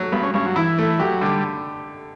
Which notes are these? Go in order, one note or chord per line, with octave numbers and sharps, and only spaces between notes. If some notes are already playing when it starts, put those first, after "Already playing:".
Already playing: F#3 A3
G2 B3
C#4
G2 C#4
F#3
E3 E4
A3
F#3 G4
D3 G3